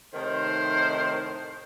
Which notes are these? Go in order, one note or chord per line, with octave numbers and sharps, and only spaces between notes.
A2 C3 D#3 C5